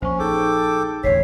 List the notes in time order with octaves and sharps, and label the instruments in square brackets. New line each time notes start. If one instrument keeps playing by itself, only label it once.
[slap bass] A#1 [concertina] C#4 [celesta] C5 C#6
[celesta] D#4 G#4 [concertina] A4 G5 D6
[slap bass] E1 A1 D2 [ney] C#5 [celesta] B6 C7